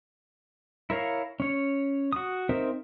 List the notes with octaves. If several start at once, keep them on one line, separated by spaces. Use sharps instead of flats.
E4 A#4 C#5 F5
C#4 C#5
F#4 D#6
C4 D#4 A#4 C5 E5